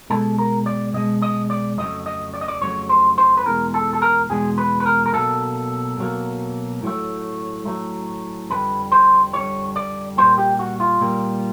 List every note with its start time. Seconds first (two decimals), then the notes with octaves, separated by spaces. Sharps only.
0.10 B2 G#3 A4
0.38 A#4
0.66 D5
0.93 B2 G#3 D#5
1.22 D#5
1.50 D5
1.78 F2 C#3 F#3 A3 D#5
2.06 D#5
2.34 D5
2.41 D#5
2.48 D5
2.61 F2 C#3 F#3 A3 C#5
2.89 C5
3.18 C5
3.37 B4
3.45 E2 B2 G#3 A#4
3.74 A4
3.93 A4
4.02 A#4
4.29 E2 B2 G#3 G#4
4.58 B4
4.80 B4
4.86 A#4
5.06 A#4
5.13 B2 F#3 A#3 A4
5.98 B2 F#3 A#3
6.82 A2 F#3 A3
7.65 A2 F#3 A3
8.50 F2 D3 G3 B4
8.92 C5
9.33 F2 D3 G3 C#5
9.76 D5
10.18 A#2 G3 A#3 C5
10.38 G4
10.59 F#4
10.80 F4
11.01 A#2 G3 A#3